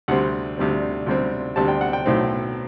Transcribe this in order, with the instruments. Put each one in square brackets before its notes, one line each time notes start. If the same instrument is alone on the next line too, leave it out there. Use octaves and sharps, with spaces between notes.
[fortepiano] D2 C3 G3 C4 F#5
D2 C3 G3 C4
D2 C3 G3 C4
D2 C3 G3 C4 A5
G5
F#5
G5
B1 A2 F#3 C4